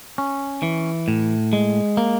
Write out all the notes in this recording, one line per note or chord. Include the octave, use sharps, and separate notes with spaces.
C#4
E3
A2
G#3
A#3